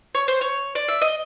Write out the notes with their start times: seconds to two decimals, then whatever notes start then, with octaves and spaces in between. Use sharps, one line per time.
0.15 C#5
0.28 C5
0.41 C#5
0.75 D5
0.88 E5
1.02 D#5